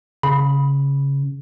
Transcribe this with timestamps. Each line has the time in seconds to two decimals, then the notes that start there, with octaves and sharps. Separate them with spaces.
0.23 C#3 B5